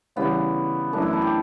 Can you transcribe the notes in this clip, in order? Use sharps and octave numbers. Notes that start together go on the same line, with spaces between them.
C#3 E3 G3 B3 C#4
F#2 E3 A3 D4
E4
A4
G4